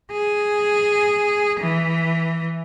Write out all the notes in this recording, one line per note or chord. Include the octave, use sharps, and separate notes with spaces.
G#4
E3